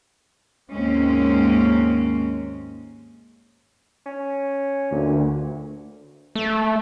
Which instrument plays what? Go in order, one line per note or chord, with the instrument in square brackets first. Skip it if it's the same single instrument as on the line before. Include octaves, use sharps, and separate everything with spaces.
[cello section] D#2 G#2 G#3 A#3 C4 C#4
[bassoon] C#4
[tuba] D2 [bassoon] A#2
[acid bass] A3